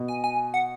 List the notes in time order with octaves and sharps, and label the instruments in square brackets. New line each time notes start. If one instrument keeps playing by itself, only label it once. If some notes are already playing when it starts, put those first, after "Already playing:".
Already playing: [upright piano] B2
[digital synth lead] G#5
G#5
F#5